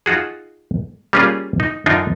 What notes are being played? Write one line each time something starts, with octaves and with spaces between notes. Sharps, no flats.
D#4 F4 F#4 G#4
G3 A#3 C#4 D4 F4 G#4
D#4
F#2 D3 D4 D#4 F4